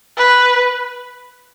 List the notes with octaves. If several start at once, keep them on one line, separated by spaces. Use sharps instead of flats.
B4